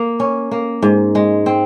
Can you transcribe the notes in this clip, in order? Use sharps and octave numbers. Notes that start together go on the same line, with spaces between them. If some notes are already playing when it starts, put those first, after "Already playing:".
Already playing: A#3
C#4
A#3
G#2
G#3
C4